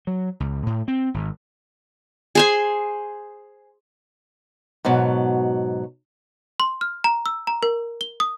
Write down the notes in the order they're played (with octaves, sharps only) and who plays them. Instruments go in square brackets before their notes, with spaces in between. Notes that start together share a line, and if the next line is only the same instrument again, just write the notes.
[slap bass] F#3
C#2
A2
C4
G#1
[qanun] G#4 C5 G#5
[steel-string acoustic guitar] G#2 B2 F#3
[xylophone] C6
F6
A#5
E6
A#5
A#4
G7
D#6